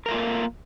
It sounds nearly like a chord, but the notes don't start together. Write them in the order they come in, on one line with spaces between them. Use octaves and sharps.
A#4 A3 F4 A#3